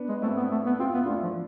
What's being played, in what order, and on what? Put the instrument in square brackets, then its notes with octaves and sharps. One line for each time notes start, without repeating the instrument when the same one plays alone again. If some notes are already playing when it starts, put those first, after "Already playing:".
Already playing: [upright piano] B3 D4
[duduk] G#3
[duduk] A3 [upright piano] C4 E4
[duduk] B3
A3
B3
[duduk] C4 [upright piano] F4
[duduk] B3 [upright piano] E4
[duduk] A3 [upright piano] D4 F4
[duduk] F3